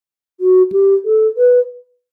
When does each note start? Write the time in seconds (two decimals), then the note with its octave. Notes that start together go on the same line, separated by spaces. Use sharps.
0.40 F#4
0.72 G4
1.05 A4
1.37 B4